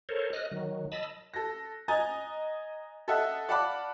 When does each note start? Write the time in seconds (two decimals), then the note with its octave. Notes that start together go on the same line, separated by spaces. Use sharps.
0.09 A4 A#4 C5 C#5
0.33 D#5 F6 F#6
0.51 D#3 F#3
0.92 D#5 A5 B5 E6
1.34 A4 A#6
1.88 D#5 G#5 A#5 A6
3.08 A4 D#5 E5 F#5
3.49 D5 F5 F#5 A5 B5 D6